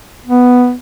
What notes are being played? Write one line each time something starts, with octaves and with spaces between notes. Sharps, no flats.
B3